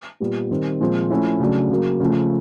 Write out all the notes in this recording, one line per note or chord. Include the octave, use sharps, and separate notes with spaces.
A#2 G3 B3
D#3 G3 C4
A#2 F3 G#3 C4
F3 A3 C#4 E4
C#3 F#3 A3 D4
C#3 F#3 A#3
C#3 F3 A3